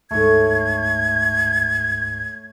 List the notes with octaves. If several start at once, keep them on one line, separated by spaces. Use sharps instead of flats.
D2 G#2 A3 C#5 G#6